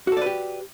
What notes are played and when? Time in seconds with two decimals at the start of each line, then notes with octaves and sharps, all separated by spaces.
0.07 F#4
0.12 A4
0.17 D5
0.21 B4
0.26 G4